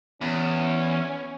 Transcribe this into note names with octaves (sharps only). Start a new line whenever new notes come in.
E2 C#4